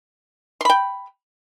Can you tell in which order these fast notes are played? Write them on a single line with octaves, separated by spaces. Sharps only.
C6 B5 G5